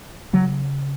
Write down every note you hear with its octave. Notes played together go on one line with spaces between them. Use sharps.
C#3 F#3